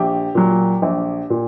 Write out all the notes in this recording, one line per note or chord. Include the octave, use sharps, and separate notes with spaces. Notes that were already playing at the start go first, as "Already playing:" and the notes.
Already playing: A#1 G4
A#2 F#3
A#1
A#2